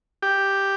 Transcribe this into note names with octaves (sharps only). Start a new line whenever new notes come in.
G4